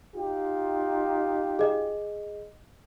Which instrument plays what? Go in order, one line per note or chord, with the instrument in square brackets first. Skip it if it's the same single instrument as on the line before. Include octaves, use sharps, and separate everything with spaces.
[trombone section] D#4 F4 G4
[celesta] G#4 D#5